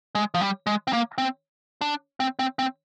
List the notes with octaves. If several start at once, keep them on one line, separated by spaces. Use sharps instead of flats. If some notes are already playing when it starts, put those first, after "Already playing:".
G#3
F3
G3
G#3
C4
A#3
C4
D4
C4
C4
C4